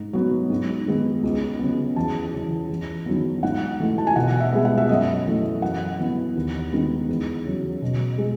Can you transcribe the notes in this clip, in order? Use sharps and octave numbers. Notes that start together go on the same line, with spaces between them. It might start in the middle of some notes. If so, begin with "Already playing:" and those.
Already playing: G#2
F#3 B3
G#2
D#3 G#3 B3
C#2
C#3 F#3 B3
E2 A5
C#3 E3
E2
D#3 F#3 B3
G#2 F#5
E3 A3
A5
G#5
B2 F#5
E5
G#3 B3
F#5
E5
F#2 D#5
E3 A3
F#2 F#5
E3 B3
D#2
D#3 G#3 B3
E2
C#3 F#3
B2
G#3